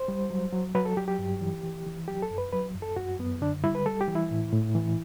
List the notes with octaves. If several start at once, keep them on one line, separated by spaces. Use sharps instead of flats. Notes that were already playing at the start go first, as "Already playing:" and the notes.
Already playing: C5
G3
F#3
F#3
F#3 B4
A4
F#3 G4
G4
G2
E3
E3
E3
F#3 G4
A4
F#2
B4
F#3 B4
F#2
A4
F#2 F#4
F#2 B3
D3 D4
G3 E4
B4
G3 A4
G4
E3
E4
A2
A2
E3